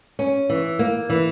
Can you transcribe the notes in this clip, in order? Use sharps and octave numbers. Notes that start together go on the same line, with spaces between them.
C#4
E3
A#3
E3